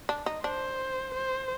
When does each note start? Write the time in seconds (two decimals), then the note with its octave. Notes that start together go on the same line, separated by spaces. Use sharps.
0.09 D4
0.26 D#4
0.43 D4 C5
1.14 C5